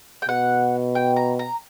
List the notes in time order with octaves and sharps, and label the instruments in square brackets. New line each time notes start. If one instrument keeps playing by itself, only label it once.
[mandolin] G5
[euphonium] B2 [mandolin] F#5
[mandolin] G5
A#5
A#5